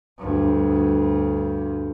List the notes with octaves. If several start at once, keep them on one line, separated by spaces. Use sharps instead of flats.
D2 G2